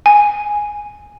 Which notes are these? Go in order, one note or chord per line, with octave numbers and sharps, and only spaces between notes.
G#5